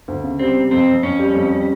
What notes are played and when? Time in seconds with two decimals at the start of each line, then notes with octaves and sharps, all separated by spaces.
0.08 D2
0.24 C#3
0.39 G3 C4
0.56 C3
0.71 F2 C4
0.87 F2
1.03 F2 C#4
1.19 G3
1.35 F2
1.51 G3